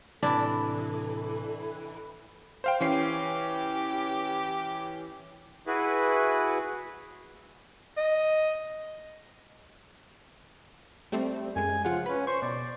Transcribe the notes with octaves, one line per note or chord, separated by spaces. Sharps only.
A2 C3 E3 D4 A4 D5
C5 F5 G5
E3 C#4 G4 C7
E4 F#4 G#4 B4
D#5
G3 A3 C4
F#2 G#3 G#5
C#3 F3 F4 F#5
C#4 B4
C5 C#6
B2 D5